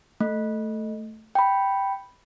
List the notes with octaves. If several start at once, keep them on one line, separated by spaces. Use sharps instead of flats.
A3
G5 B5